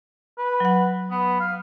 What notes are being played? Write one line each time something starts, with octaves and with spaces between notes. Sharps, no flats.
B4
F#3 F#5
B3
F5